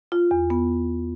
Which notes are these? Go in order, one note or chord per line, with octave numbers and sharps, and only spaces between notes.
F4
E2
B3